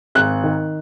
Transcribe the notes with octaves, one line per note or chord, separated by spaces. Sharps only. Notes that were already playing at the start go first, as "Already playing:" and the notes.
G#1 F#6
D#3